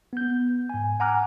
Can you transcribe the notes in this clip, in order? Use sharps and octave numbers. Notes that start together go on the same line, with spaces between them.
B3 G6
G#2 G#5
F#5 G#5 A#5 D6 F6 F#6